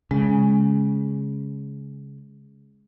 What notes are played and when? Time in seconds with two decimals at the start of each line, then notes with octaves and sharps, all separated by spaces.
0.11 C#3 G#3